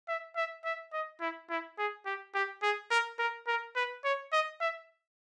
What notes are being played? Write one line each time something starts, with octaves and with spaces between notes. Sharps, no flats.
E5
E5
E5
D#5
E4
E4
G#4
G4
G4
G#4
A#4
A#4
A#4
B4
C#5
D#5
E5